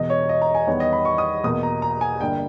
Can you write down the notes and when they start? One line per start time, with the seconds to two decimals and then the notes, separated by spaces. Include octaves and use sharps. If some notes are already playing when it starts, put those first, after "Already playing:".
Already playing: E1 E2 B2 D#5
0.10 C#5
0.29 D#5
0.42 A#5
0.55 G#5
0.67 E2 D#3 G3 B3 C#5
0.80 D#5
0.93 B5
1.05 C#6
1.18 D#6
1.44 E2 B2 A#3 D#6
1.63 A#5
1.82 A#5
2.01 G#5
2.20 G1 G2 G3 A#3 G5